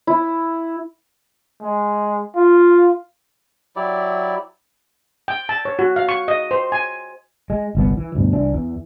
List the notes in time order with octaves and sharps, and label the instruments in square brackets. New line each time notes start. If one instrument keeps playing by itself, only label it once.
[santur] E4
[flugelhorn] G#3
F4
[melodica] F#3 E4 G4 D5
[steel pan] G5
A5
C#5
F#4
F5
C#6
D#5
C5
G#5
[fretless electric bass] G#3
G1 C2 B3
E3
D2 G2 B2
C2 E3 D4
E2 E3